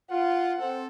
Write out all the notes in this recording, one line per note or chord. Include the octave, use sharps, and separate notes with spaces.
F4 F#5
C4 A4